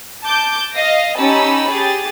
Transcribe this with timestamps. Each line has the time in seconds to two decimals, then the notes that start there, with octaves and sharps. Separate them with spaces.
0.23 A5 D6 G6
0.75 D#5 F5 A#6
1.17 C#4 D#4 G4 A5 B5 E6
1.71 G4 G#4 A6